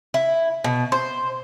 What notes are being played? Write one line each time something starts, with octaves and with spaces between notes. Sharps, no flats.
E4
B2
C5